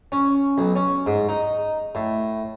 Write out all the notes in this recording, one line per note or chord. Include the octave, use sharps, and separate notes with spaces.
C#4
B1
C#4
G#2
D#4
A2